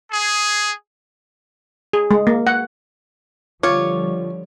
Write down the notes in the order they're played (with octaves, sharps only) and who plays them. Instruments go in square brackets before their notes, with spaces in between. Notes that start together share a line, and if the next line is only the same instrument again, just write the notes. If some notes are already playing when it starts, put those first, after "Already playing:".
[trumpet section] G#4
[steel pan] G#4
G#3
A#3
F#5
[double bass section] D3 F3 G3 [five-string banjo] F4 [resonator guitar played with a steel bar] C#5 [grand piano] D6